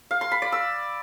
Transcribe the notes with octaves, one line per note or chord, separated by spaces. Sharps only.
F5
C6
B5
D5
E6